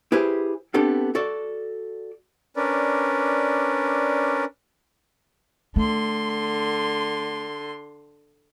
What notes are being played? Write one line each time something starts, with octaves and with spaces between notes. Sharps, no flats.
E4 G4 G#4 B4 C5
B3 C4 D4 G4 A4
F#4 A4 D5
C#4 D4 A#4 B4 D5
D3 A3 C6